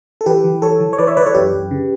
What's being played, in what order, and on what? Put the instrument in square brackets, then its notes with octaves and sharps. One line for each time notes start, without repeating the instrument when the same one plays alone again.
[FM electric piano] A4
E3 G4 B4
E3
E3 A4 C#5
E3
C#5
E3 B4 D5
C#5 E5
E3 B4 D5
A4 C#5
F#2 G4 B4
F#2
C#3